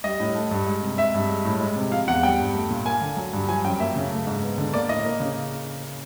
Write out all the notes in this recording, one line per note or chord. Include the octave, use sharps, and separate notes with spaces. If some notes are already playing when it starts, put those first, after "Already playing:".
G3 D#5
A2
A3
G2
G#3
C3
G#3 E5
G2
G#3
A2
G#3
C3
F3 F5
E2 F#5
G3 G5
G2
A3
A#2
A#3 G#5
D3
F#3
G2
F3 G#5
F#2 G5
A#3 E5
C#3
A3
G#2
B3
D3
A#3 D5
A2 D#5
A#3
C#3